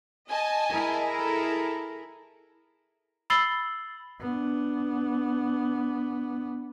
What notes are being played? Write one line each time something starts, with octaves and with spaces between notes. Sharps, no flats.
D#5 G#5 A5
E4 G#4 A#4
A4
B5 E6 A6 C7 F#7 G7
B3 D4